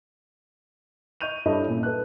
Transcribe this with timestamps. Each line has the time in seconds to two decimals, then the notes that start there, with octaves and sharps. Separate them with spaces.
1.21 D#5 C#6 G6 D#7 F7
1.46 G2 E4 A4 C#5 D#5 B5
1.69 A#2 C#4
1.83 A4 B4 F#6